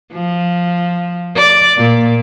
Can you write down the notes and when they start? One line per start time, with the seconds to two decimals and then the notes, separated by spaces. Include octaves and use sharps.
0.13 F3
1.36 D5
1.77 A#2